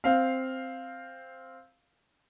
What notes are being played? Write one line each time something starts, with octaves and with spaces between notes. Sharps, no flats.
C4 F5